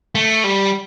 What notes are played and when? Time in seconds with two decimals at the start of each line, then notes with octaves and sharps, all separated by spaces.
0.15 A3
0.44 G3